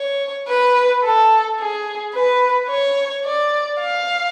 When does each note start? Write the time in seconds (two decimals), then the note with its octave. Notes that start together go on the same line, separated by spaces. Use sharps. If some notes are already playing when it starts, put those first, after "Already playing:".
Already playing: C#5
0.48 B4
1.04 A4
1.59 G#4
2.14 B4
2.69 C#5
3.25 D5
3.81 F5